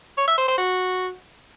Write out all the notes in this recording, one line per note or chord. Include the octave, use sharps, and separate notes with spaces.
C#5
E5
C5
C5
F#4